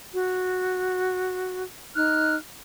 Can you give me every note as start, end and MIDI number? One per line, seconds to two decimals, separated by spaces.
0.14 1.62 66
1.96 2.36 63
1.96 2.36 89
1.96 2.36 90